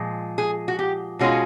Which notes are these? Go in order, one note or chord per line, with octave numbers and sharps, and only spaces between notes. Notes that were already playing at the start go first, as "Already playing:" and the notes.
Already playing: A#2 F3 G#3
G#4
F#4
G4
B2 G#3 C#4 F4 F#4